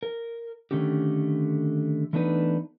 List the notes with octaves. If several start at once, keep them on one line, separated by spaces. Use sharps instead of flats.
A#4
D3 D#3 A3 C#4 F#4 G4
E3 A3 B3 D4 D#4 B4